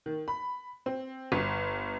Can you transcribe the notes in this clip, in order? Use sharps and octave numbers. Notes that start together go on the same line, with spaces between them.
D#3
B5
C4
G1